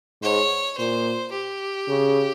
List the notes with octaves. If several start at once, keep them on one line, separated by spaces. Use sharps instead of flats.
G#2 C#5
A#2 C5
G4
C#3